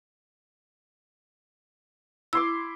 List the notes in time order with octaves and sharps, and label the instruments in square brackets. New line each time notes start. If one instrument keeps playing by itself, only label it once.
[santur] E4 C6 D6 [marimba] E6